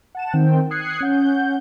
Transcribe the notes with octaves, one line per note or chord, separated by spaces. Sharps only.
F#5 A5 E7
D#3 C4 G5
D#6 F#6 G#6 C7 C#7
C#4 F#5 G6